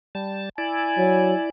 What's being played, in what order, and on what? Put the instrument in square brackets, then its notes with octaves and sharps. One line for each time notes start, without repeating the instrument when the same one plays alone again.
[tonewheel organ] G3 A5
[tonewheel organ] E4 D5 [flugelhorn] G#5
[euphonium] F#3